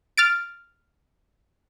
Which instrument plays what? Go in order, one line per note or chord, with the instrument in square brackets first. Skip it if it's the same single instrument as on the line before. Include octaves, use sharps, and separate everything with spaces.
[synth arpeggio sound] F6 A6 D7